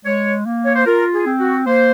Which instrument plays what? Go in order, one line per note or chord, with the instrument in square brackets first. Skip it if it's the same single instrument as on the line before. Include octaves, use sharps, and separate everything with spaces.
[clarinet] G#3 [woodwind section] C#5
[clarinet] A#3
[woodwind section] C#5
C5
[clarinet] F4 [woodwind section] A#4
[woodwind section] G#4
[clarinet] C4
[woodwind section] F#4
[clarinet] A#3 [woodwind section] C5